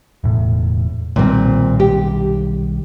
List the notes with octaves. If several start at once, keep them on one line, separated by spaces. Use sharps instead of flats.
E1 A2
B1 A#2 D#3 G3 C4
G4